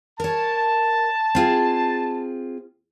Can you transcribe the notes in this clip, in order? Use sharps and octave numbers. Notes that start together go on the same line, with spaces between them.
A#4 C#5 A5
C4 F4 G#4